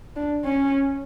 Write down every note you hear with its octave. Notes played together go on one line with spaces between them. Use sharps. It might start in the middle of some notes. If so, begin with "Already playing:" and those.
D4
C#4